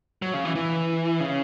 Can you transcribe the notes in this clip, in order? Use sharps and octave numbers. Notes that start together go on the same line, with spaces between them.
F#3
C#3
E3
E3
C#3